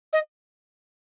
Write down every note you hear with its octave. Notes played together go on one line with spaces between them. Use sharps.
D#5